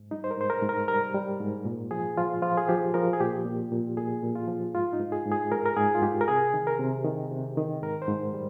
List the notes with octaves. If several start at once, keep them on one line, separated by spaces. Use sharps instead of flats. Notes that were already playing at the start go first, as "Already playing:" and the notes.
Already playing: G#2
G3 D#4
C5
A#4
G#2 C5
A#4
G#2
A#4
G3 A#4
G3
G#2
A#2
F3 G#4
F3 F4
F3 F4
G#4
F3 G4
F3 A#4
G#4
A#2 G4
A#2
A#2
A#2 G#4
A#2
F4
F3
G#2 F4
D#4
G#2
G#4
G#2
G#4
G#2 A#4
A#4
G#2 G#4
F4
G#2 G4
A#4
C3 G#4
D#3
A#4
C3
D#3
C3
D#3
G#2 A#4
C5
G#2
G3